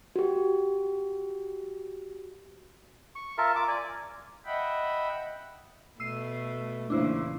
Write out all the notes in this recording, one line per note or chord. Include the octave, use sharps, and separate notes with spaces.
F#4 G4
C#6
F4 A#4 E5 A5
F4 D6
D5 G#5
D#5 E5 F#5 G5 B5
B2 A3 E6 C7 D#7
E2 A#2 C#3 D4 E4 C5